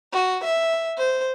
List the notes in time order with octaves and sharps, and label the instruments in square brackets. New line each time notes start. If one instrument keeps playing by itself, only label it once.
[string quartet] F#4
E5
C5